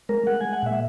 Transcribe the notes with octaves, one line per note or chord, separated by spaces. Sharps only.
G#3 A#4
G#3 F#5
G#3 G#5
F#5
A#2 E5